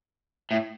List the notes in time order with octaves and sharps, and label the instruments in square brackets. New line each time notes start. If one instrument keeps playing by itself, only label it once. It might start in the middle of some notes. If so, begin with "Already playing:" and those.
[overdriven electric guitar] A2